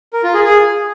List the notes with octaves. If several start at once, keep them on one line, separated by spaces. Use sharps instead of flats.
A#4
F4
G#4
G#4